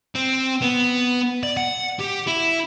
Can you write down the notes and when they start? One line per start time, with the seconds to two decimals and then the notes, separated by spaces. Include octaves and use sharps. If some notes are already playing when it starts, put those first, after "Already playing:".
0.15 C4
0.62 B3
1.43 D5
1.57 F#5
1.99 G4
2.27 E4